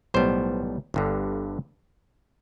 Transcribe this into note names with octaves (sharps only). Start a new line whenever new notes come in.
B1 A2 G3 B3 C5
G1 G2 D3